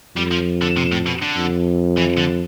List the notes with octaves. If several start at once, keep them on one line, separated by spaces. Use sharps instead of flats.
F2 G3
F3
D3
C3
A2
B2
D3
F2
E3
D3